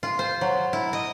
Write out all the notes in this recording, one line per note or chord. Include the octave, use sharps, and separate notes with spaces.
F4
C5
F#3
E4
D#5